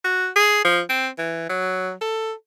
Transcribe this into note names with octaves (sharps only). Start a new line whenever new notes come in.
F#4
G#4
F3
C4
E3
F#3
A4